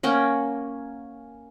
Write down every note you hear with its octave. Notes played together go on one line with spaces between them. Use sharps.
A#3 C#4 F#5 G5